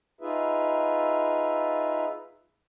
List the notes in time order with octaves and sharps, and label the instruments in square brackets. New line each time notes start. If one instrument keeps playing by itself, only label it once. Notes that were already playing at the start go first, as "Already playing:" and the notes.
[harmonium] D#4 F4 G#4 B4 E5